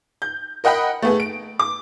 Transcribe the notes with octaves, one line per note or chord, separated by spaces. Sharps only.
G6
A#4 D#5 F#5 G5 B5
A3 B3 G#4
D7
D6